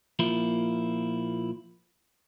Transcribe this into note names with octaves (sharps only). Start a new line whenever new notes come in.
A#2 F3 A#3 E4